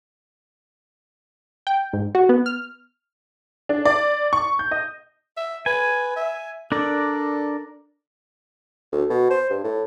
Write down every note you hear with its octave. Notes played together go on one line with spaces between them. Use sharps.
G5
G#2
F#4
B3
F6
D4
D5
C#6
G6
D#5
E5
B4 G#5
E5
D4 A4 A#4 D5
D2
B2
C5
G2
A2